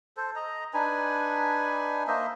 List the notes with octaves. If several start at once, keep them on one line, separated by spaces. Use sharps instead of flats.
A4 C5
D#5 A#5
D4 D#4 B4 G#5
A#3 C5 D#5 E5